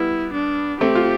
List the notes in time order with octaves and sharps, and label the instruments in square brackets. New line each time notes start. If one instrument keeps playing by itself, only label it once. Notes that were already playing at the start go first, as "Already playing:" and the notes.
Already playing: [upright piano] G3 B3 [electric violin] E4
[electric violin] D4
[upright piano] A3 C4 [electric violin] G4
[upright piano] F4